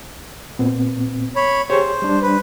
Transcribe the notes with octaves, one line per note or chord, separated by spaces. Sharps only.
A#2 B3 C4
C#5 B5
G4 G#4 C5 C#5
G3 D4
B4